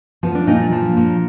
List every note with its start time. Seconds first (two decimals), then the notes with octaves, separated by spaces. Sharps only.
0.23 F3 B3
0.35 D4
0.47 A#2 D#4
0.60 D4
0.72 F3
0.97 A#2